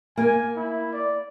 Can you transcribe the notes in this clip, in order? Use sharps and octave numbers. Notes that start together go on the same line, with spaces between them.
A#3 G#5
E4
D5